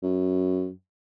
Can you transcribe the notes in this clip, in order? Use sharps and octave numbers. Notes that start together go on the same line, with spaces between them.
F#2